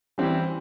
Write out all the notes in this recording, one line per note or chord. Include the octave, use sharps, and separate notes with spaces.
E3 G3 C4 E4 G4